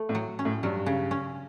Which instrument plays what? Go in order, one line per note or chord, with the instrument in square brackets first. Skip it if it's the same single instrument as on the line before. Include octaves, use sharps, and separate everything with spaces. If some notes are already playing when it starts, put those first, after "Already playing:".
Already playing: [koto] A3
[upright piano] A2
[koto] F#3
C#4
[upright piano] A2
[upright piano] G2 [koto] F#3
[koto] C#3
C#4